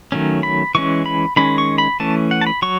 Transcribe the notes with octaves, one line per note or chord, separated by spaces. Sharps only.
D#3 F#3 A3 C#4
B5
E3 G#3 C#4 C#6
B5
D#3 G#3 C#4 B5
C#6
B5
E3 A3 C#4 A5
F#5
A5
B5
F#3 C#6